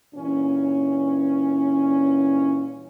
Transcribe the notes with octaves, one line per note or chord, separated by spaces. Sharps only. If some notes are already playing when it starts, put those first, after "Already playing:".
G2 A#2 E3 C#4